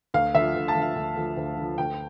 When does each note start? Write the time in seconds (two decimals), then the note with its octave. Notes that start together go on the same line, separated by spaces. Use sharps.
0.14 D2 F5
0.35 D3 F3 E5
0.56 D2
0.68 A5
0.75 D3 F3
0.82 F5
0.96 D2
1.17 D3 F3
1.37 D2
1.57 D3 F3
1.78 D2 G5